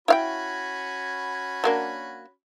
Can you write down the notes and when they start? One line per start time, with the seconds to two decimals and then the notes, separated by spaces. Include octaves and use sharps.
0.08 C#4 E4 F#4 F5 G5 B5
1.64 F#3 A#3 D4